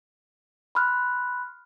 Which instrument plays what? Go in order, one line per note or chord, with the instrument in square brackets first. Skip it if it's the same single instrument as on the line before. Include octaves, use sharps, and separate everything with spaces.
[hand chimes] B5 C6 F6 F#6